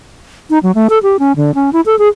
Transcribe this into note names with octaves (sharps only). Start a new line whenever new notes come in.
D#4
F#3
A3
A4
G4
C#4
D3
C#4
E4
A4
G#4